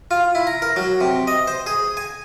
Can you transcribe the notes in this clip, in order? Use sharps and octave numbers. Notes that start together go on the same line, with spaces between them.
F4
E4
A#5
A#4
F#3
C3
D#5
C5
G#4
G#5